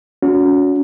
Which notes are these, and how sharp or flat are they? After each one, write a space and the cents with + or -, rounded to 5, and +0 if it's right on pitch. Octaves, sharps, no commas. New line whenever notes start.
C#4 +35 F#4 -25